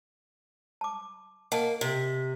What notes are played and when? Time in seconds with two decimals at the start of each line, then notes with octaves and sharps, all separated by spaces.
0.81 A5 D6
1.52 A#3 D#5 F#5 A5
1.81 C3